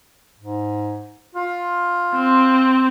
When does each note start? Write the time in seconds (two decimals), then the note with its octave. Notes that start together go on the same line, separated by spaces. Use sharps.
0.38 G#2
1.35 F4
2.14 C4